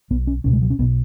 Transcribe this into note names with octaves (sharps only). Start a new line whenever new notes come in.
B1 B2 B3
C#4
C#2 B2 C#4
G#3
F#3
C#4
B1 B2 B3